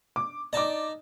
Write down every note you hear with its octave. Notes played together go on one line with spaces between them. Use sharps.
D6
D#4 D5 A5 A#5 D6